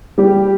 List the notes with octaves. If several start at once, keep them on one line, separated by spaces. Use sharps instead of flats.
G3 G4